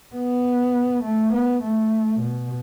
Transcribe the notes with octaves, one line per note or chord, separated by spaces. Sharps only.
B3
A3
B3
A3
B2